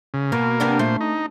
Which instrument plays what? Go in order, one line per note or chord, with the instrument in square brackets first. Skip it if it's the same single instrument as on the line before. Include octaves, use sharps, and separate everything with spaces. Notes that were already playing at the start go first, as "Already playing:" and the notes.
[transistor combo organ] C#3
[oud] B2 [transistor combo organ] A#3
[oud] C3 B3 D4
[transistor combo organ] A#2 C5 [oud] A3
[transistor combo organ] D#4